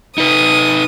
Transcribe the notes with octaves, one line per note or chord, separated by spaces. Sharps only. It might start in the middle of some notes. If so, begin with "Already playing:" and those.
D#4 B4 D#6